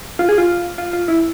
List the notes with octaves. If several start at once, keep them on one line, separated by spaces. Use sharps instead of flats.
F4
G#4
F4
F4
F4
E4